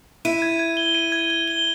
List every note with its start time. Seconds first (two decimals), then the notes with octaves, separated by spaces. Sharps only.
0.25 E4 D#7
0.42 G#6
0.59 G#6
0.77 G7
0.95 D#7
1.12 G#6
1.30 G#6
1.48 G7